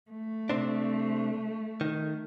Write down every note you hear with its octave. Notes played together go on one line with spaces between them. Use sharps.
A3
C3 C4 D4
D#3